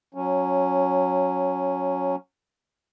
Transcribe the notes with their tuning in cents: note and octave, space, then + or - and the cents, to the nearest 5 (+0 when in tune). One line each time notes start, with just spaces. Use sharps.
F#3 -15 C#4 +0